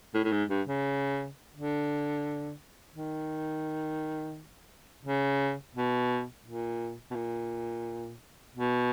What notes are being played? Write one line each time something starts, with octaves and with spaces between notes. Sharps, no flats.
A2
A2
G#2
G2
C#3
D3
D#3
C#3
B2
A#2
B2
A#2
B2